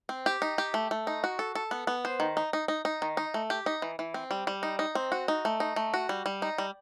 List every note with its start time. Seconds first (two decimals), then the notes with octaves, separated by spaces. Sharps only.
0.09 C4
0.26 G4
0.42 D#4
0.58 G4
0.74 A3
0.91 A3
1.07 D#4
1.24 F#4
1.39 A4
1.55 A4
1.71 B3
1.87 B3
2.05 C5
2.20 D#3
2.37 D#4
2.53 D#4
2.68 D#4
2.85 D#4
3.02 D#3
3.17 D#4
3.34 A3
3.50 G4
3.66 D#4
3.82 E3
3.99 E3
4.14 C4
4.31 G3
4.47 G3
4.63 D#4
4.79 D#4
4.95 C4
5.12 F#4
5.28 D#4
5.45 A3
5.60 D#4
5.76 A3
5.94 F#4
6.09 G3
6.26 G3
6.42 D#4
6.58 G3